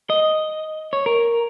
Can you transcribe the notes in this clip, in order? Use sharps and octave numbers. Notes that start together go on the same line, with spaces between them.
D#5
C#5
A#4